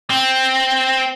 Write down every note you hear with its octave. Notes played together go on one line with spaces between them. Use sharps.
C4